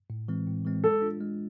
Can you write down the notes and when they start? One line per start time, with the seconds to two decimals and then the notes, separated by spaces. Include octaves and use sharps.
0.10 A2
0.28 E3 G#3 C4
0.47 A2
0.65 E3 G#3 C4
0.84 G#3 A4
1.02 D4 F4
1.20 G#3